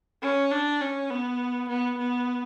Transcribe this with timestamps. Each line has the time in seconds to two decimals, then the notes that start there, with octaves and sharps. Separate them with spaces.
0.22 C#4
0.51 D4
0.81 C#4
1.10 B3
1.69 B3
1.98 B3